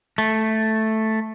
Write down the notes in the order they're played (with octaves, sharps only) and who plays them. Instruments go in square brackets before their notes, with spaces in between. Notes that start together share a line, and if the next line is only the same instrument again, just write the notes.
[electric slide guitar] A3